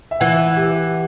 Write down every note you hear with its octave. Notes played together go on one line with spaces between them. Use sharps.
E5
E3 F#5
G4